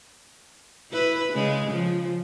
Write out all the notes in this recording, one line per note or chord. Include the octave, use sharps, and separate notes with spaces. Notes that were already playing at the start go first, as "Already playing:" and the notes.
E4 B4
C#3 G#3
C#3 F3